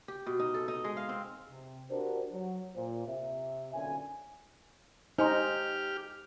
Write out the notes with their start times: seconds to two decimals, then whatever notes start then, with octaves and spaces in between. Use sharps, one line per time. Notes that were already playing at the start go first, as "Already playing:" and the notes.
0.08 G4
0.26 B2
0.39 D#4
0.54 A4
0.68 D#4
0.84 G#3
0.97 F5
1.09 C4
1.50 C3
1.90 D4 F#4 G4 A#4 C5
2.32 F#3
2.76 A#2 C5
3.07 C3 E5
3.74 B1 A#2 D3 C#4 G#5
5.18 D#4 G4 C5 G#5 C6 F6